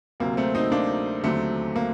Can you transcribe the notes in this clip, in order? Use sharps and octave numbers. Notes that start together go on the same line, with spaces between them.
D2 C3 F#3 A#3
A3 C4
C4 D#4
A#3 D4
D#2 D3 F#3 A3 C4
A#3